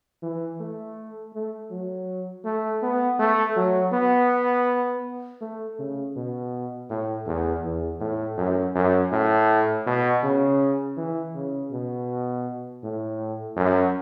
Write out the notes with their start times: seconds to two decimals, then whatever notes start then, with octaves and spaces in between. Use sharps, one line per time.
0.22 E3
0.60 A3
1.34 A3
1.71 F#3
2.45 A3
2.83 B3
3.19 A3
3.57 F#3
3.93 B3
5.41 A3
5.79 C#3
6.16 B2
6.90 A2
7.26 E2
7.64 E2
8.00 A2
8.37 F#2
8.75 F#2
9.12 A2
9.86 B2
10.23 C#3
10.97 E3
11.35 C#3
11.72 B2
12.83 A2
13.57 F#2